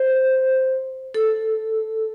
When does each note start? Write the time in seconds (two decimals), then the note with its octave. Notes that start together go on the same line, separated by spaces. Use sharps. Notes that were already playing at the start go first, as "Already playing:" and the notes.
Already playing: C5
1.14 A4